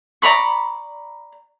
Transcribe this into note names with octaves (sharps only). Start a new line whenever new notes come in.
D5 A#5 B5 C#6